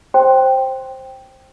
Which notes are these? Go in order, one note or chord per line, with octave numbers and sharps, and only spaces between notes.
C5 G5 C6